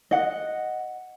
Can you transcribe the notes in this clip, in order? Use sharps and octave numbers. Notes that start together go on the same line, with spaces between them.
D#5 F#5